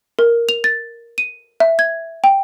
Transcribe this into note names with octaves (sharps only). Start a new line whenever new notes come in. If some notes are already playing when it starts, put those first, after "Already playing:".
A#4
F7
A6
D#7
E5
G#6
G5